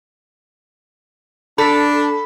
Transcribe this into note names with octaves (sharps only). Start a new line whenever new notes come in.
D4 A4 B5 B6